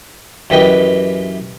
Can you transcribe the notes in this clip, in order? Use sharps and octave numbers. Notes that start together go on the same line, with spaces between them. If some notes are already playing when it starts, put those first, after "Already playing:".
F#2 E3 G4 B4 D#5 G5